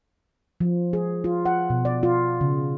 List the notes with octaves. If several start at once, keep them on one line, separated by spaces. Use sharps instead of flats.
F3
G#4
F4
F#5
B2
D5
F4
C#3